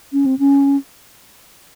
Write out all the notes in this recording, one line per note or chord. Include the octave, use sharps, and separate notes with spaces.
C#4
C4
C#4